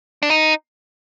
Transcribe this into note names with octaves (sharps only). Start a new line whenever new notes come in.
D4
D#4